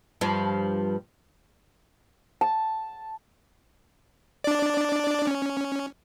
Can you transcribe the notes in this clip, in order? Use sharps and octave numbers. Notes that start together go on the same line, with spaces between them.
G2 F3
A5
D4 D5
C#4